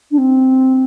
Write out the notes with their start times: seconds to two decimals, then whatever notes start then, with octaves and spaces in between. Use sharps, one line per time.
0.11 D4
0.18 C4